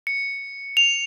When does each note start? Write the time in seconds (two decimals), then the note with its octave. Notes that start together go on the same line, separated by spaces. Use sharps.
0.07 C#7
0.77 F7